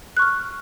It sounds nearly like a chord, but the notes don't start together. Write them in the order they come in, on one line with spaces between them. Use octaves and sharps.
F#6 C#6 F6